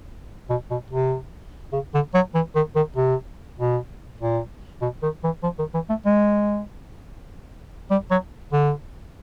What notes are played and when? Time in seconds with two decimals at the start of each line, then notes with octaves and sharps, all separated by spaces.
0.50 B2
0.71 B2
0.90 C3
1.73 C#3
1.94 D3
2.14 F#3
2.35 E3
2.55 D#3
2.76 D#3
2.96 C3
3.59 B2
4.21 A#2
4.81 B2
5.03 D#3
5.24 E3
5.43 F3
5.59 D#3
5.74 E3
5.90 A3
6.06 G#3
7.91 G3
8.11 F#3
8.53 D3